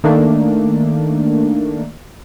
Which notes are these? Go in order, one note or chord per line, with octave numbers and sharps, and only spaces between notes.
D#3 A3 A#3 D4